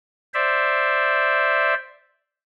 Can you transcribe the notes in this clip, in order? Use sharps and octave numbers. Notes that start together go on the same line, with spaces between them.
C5 D5 E5